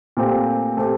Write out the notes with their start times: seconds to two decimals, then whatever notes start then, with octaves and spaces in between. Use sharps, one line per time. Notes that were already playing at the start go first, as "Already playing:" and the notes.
0.17 A#2 A3 C4 G4
0.77 A3 C4 G4